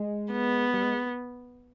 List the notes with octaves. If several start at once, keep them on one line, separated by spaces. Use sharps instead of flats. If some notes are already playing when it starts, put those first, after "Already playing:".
Already playing: G#3
B3
G3
G#3